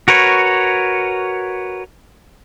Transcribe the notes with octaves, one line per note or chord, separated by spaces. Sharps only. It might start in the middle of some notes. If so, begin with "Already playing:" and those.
F#4 A#4 B4 C#5